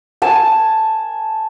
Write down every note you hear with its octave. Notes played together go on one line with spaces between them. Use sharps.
G#5 A5